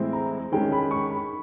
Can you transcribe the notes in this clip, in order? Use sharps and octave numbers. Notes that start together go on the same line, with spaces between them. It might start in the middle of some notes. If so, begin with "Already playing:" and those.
Already playing: A2 E3 G#3 C4 E4
A#5
D#3 G#3 C#4 G5
B5
C#6
B5